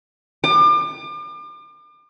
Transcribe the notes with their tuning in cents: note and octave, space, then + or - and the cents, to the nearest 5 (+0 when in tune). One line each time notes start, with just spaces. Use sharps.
D6 +40